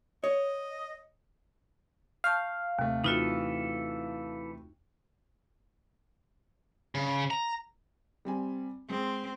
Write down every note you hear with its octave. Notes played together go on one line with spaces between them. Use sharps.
C#5 D#5
F5 A5 C#6 G6
D#2 C3 A3
E3 D#4 F4 F#4 A4
C#3
A#5
G3 C4 G#5
G#3 C4